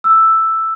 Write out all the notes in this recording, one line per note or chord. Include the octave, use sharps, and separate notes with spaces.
E6